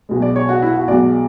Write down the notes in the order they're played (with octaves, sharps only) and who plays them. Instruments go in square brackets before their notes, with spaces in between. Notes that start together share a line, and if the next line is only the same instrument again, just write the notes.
[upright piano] B1 B2 G#3
D5
C#5
F#4
E4
F#4
B1 B2 G#3 D5